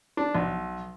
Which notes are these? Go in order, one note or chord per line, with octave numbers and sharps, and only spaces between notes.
D4
B1